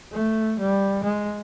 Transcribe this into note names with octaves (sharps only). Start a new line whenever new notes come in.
A3
G3
G#3